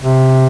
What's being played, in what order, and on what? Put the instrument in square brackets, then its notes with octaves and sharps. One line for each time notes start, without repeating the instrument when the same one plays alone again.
[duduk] C3